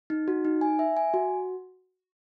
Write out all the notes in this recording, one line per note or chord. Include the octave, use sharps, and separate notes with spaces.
D#4
F#4
D#4
G#5
E5
G#5
F#4